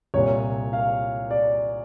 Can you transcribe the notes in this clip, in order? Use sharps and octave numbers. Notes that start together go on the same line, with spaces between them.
C2 A#2 C#5
F5
D5